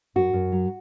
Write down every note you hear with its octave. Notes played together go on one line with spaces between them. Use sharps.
F#2 F#4
F#2
F#3